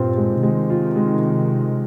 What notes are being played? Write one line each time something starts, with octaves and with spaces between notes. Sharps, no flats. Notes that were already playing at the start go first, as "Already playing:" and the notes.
Already playing: G2 A#2 C4 F4
G#3
C3 D#3 G#3
F4
G#3